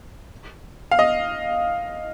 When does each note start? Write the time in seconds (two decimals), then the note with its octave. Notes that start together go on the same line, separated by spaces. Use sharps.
0.91 F5
0.99 D#5